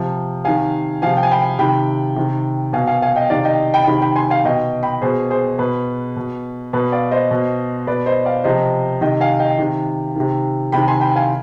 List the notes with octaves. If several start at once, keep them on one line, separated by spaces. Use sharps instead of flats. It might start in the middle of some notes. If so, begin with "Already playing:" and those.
Already playing: C3 F3
C3 D#3 F5 G#5
C3 F3 F5 G#5
G5
G#5
G5 B5
C3 D#3 G5 B5
C3 D#3
B2 F5 G#5
F5 G#5
F5 G#5
D#5 G5
C3 D#3 D5 F5
D#5 G5
G5 B5
C3 D#3 G5 B5
G5 B5
G#5 C6
F5 G#5
B2 D#5 G5
G5 B5
B2 G#4 C5
G#4 C5
B2 B4
B2
B2 B4
D5 F5
C5 D#5
B2
B2 B4 D5
C5 D#5
D5 F5
C3 F3 C5 D#5
C3 D#3 D#5 G5
F5 G#5
D#5 G5
C3 D#3
C3 D#3
C3 D#3 G5 B5
G#5 C6
G5 B5
F5 G#5